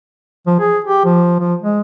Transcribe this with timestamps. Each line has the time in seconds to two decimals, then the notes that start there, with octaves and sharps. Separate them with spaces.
0.47 F3
0.60 G#4
0.84 G4
1.05 F3
1.40 F3
1.62 G#3